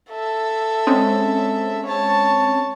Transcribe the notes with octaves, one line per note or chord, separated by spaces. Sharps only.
A4 E5
G#3 C4 C#4
C#5 A5